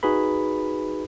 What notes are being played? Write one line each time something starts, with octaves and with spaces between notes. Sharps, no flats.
D#4 F#4 G#4 B4 B5